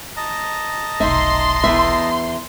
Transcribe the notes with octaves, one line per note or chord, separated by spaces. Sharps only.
D#5 A5 A#5
F1 B1 D#4 E5 C6
E2 B3 E5